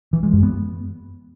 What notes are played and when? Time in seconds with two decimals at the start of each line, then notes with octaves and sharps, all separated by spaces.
0.13 E3
0.23 G#3
0.33 F#2
0.43 B3